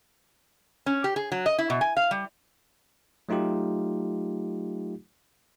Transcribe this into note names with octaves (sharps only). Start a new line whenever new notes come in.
C#4
G4
G#4
F#3
D#5
E4
B2
G#5
F5
G3
F#3 A3 D#4 F4 G4